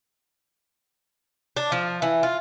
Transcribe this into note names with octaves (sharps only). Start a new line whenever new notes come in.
D4
F3
E3
F4